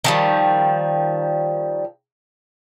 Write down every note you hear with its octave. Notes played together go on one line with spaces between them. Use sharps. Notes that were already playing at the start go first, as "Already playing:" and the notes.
D#3 F3 G3